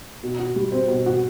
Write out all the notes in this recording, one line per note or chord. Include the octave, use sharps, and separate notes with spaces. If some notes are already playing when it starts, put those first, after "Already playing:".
B2
F#4
G3
C4
B2
F#4